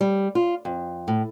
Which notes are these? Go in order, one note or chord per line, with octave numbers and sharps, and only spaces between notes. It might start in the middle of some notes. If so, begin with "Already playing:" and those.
G3
F4
F2
A2